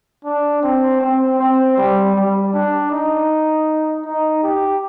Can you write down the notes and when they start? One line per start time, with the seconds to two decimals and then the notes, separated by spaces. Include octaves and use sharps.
0.25 D4
0.63 C4
1.01 C4
1.39 C4
1.77 G3
2.15 G3
2.53 D4
2.91 D#4
4.05 D#4
4.43 G4